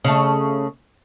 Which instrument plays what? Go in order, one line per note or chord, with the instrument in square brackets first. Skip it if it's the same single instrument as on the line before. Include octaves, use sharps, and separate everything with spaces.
[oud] C#3 A3